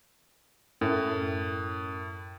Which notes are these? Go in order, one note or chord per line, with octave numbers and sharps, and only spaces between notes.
F#2 A2